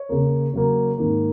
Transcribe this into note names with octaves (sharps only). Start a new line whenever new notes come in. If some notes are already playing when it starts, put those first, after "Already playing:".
Already playing: C#5
C#3 A#3
C#3 F#3 A#3
G#2 D#3 A#3